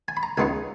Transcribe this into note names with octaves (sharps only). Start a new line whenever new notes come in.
G#5
B5
A#5
C#2 C#3 G#3 B3 D#4 G#5